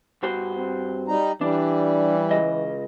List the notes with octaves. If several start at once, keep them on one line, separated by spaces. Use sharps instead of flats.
G2 F#4 C5
C4
G3 D#4 A#5
E3 G3 D4
C#2 D#5